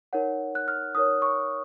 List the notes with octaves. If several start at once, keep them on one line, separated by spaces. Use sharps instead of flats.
D#4 A#4 C#5 F#5
F#6
F6
D#4 A#4 C#5 D#6
C#6